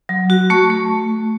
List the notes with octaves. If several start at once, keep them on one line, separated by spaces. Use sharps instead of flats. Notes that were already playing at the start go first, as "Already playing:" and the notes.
F#3
F#4
A3 C#6
A3